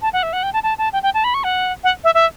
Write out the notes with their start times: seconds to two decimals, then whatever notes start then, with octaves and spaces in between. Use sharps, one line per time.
0.02 A5
0.13 F#5
0.23 E5
0.33 F#5
0.43 G5
0.53 A5
0.63 A5
0.78 A5
0.93 G5
1.03 G5
1.14 A5
1.24 B5
1.34 C#6
1.44 F#5
1.84 F#5
2.04 E5
2.15 E5